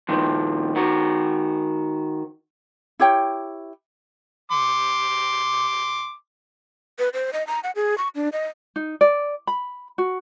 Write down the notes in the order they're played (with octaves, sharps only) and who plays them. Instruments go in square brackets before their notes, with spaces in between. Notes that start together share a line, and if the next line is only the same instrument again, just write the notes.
[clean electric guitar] A#2 D#3 F3
D#3 F#4
[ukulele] E4 G4 C#5 G5
[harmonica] C6 D6
[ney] B4
C5
D#5
A#5
F#5
G#4
C#6
D4
D#5
[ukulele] D#4
D5
B5
F#4